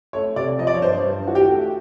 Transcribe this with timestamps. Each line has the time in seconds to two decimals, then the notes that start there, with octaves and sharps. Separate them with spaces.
0.13 A3 C#5
0.36 C3 D5
0.59 F3 D#5
0.67 D5
0.74 C#5
0.82 G2 C5
1.04 G2
1.27 E3 F#4
1.35 G4
1.41 F#4
1.50 A3